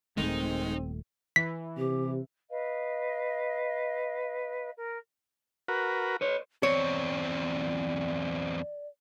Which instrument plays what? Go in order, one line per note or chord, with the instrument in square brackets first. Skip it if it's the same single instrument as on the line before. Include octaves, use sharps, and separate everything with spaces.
[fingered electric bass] D#1 F2 A3 [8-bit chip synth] D#3 G#3 [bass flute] C4 [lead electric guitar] D#4
[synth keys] E3 [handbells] B6
[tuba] C3 [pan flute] G4
[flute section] B4 D#5 F5
A#4
[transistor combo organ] F#4 A#4 B4
[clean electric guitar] B4 C#5
[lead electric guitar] E2 C4 [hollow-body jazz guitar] C#5 [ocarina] D5